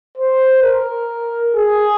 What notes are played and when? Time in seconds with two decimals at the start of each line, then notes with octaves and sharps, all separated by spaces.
0.17 C5
0.63 A#4
1.55 G#4